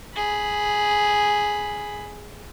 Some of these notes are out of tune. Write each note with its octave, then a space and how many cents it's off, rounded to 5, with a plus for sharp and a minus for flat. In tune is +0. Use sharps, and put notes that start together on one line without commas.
G#4 +0 B5 +0